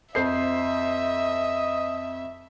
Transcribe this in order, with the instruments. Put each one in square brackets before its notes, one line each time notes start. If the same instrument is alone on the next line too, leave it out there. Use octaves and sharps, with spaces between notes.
[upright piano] F2 C5 C7 [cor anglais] D#5 [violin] E5